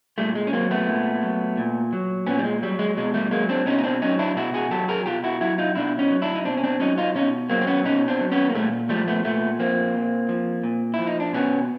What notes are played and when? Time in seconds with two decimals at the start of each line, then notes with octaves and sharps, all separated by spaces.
0.18 A#2 G3 A3
0.35 G#3
0.47 C#4
0.53 F#3 A#3 C4
0.71 A3 B3
0.88 A#2
1.22 F#3
1.57 A#2
1.93 F#3
2.27 A#2 B3 C#4
2.39 G3
2.44 G#3
2.63 F#3 G3
2.79 G#3
2.97 B2 G#3
3.14 G3 A3
3.31 F#3 G#3 A#3
3.49 C4 D4
3.66 B2 C#4 D#4
3.79 D#4
3.84 C4 D4
4.02 F#3 C#4 D#4
4.19 D4 E4
4.36 B2 E4 F#4
4.54 F#4 G#4
4.71 F#3 G4 A4
4.88 G#4 A#4
5.06 B2 F4 G4
5.24 E4 F#4
5.41 F#3 E4 F#4
5.58 D#4 F4
5.75 B2 D4 E4
5.99 C#4 D#4
6.10 F#3
6.22 D4 E4
6.35 D#4
6.45 B2 C4 D4
6.57 C#4
6.63 C4 D4
6.80 F#3 C#4 D#4
6.98 D#4 F4
7.15 B2 C#4 D#4
7.50 F#3 A#3 C4
7.61 C4
7.67 B3 C#4
7.84 B2 C#4 D#4
8.08 C4 D4
8.20 F#3
8.32 B3 C#4
8.49 A#3
8.55 A#2 G3 A3
8.89 F3 G3 A3
9.08 A3 B3
9.25 A#2 A3 B3
9.59 F3 A#3 C4
9.94 A#2
10.29 F3
10.63 A#2
10.94 E4
10.99 F3
11.07 D#4
11.20 D4
11.33 B2 B3 C#4